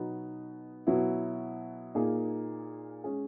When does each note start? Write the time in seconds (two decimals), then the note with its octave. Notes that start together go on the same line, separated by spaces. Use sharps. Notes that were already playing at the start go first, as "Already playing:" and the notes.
Already playing: B2 F#3 B3 D#4
0.87 B2 F#3 B3 E4
1.95 A#2 A#3 D#4 G#4
3.04 G#3 C#4 G#4